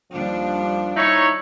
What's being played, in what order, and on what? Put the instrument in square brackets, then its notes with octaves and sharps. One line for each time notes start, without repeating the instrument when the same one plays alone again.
[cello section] D#2 G3 D4 [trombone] F3
[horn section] D#4 E4 C#5